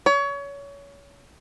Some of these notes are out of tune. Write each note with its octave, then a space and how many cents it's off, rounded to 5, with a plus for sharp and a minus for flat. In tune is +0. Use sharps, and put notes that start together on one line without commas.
C#5 +25